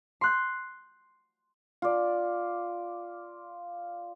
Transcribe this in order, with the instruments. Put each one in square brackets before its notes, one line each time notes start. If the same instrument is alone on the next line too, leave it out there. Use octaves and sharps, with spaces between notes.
[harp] C6 F#6 G6
[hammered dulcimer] F4 D5